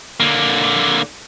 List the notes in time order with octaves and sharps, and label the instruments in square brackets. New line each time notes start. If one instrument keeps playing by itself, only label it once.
[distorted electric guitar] D3 A#3